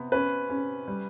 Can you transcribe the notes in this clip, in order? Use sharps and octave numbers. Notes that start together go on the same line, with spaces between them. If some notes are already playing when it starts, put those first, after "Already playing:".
Already playing: C3 B3
C#4 B4
C#4
G3